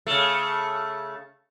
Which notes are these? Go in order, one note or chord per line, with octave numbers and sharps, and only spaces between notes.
C#3 A3